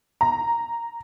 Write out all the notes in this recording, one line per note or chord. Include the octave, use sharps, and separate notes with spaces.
A#5